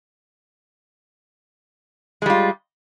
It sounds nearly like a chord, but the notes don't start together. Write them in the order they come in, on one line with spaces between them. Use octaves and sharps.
G#3 G3 F4